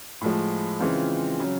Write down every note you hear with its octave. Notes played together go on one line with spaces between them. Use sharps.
A2 F3 G#3
C#3 E3 G#3 C4 F4
C#3 F#3